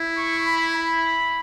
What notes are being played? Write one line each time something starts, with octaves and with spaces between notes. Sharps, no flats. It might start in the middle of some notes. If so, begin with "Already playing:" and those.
Already playing: E4
C#6
B5
B5